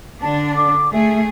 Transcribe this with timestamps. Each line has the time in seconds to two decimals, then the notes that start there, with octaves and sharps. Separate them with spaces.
0.21 D3 D4 A5
0.56 D6
0.92 A3 G#4 E5